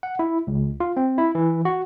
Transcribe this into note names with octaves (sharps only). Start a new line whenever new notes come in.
F#5
E4
C#2
F4
C4
E4
E3
F#4